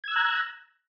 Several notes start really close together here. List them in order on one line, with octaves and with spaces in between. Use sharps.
G#6 E6 F#6 A#5